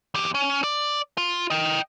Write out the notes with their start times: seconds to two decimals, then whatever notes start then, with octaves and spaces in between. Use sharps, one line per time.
0.15 E2 G4
0.35 C#4
0.64 D5
1.18 F4
1.50 D#5 G5